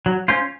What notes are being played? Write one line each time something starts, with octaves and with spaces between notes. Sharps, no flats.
F#3
C#4 F4 C5